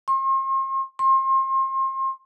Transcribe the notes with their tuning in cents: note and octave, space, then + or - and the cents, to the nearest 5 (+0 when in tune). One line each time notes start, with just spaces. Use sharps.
C6 +45
C6 +35